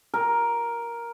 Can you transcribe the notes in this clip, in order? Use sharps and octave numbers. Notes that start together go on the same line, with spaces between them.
A#4